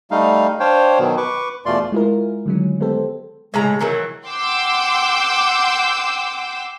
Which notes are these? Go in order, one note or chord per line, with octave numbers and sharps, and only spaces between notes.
G3 A3 D#4 F5
D4 C5 C#5 F5 G5
B2 D#3 F#3 B3
B4 C#6 D6
E2 B2 A3 F4 D5 C6
G#3 E4 F4 G#4 A#4
D3 D#3 F#3 G#3 C#4
G#3 B3 G4 A4 C5
A2 C#3 G#3 A#5
D#3 E3 F#3 A#4
F#5 G5 C6 D6 E6 G6